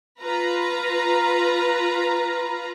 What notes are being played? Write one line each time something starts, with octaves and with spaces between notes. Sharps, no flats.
F4 B4 A#5